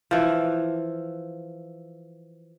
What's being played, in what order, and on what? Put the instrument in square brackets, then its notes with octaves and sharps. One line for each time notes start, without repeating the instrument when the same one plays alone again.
[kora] E3 F3